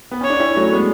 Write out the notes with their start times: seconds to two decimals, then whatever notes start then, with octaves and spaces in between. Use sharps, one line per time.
0.11 B3
0.21 C#4 C#5
0.30 D4
0.40 C#4 E4
0.56 F#3 A3
0.72 G#3 B3